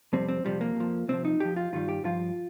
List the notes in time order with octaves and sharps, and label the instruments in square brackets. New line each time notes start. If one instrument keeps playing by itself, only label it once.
[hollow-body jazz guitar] F2 C3 G3 C4
C4
F2 C3 F3 G3
A#3
F2 F3
C2 C3 F3 C4
D#4
F2 F3 G4
F4
G2 D#3 G3 F4
G4
G2 F3 F4